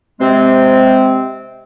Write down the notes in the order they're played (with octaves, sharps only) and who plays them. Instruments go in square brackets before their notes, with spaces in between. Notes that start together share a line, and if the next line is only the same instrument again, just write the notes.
[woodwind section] C3 G#3 C4